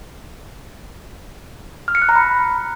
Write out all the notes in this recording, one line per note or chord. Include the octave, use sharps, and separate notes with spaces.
F6
C#7
F#6
A#5
B5